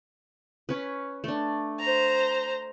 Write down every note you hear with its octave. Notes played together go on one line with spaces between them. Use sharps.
C#4 B4
A3 D4
C5 A#5